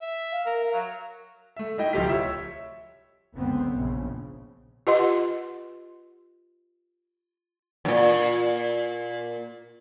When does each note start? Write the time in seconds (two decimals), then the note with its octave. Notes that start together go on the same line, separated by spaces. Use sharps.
0.02 E5
0.32 F5
0.46 A#4
0.74 F#3
1.56 A3 E5
1.78 A3 D#4 E4 D#5 G5
1.93 D1 C2 F3 G4 B6
2.09 C#5 E5
3.36 F#1 C#2 D3 B3 C4
3.69 A#1 C#3
4.87 F4 G4 B4 D#5 F#5 C6
7.85 E2 A#2